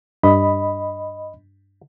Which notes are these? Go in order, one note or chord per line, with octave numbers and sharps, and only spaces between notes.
G2 D#5 B5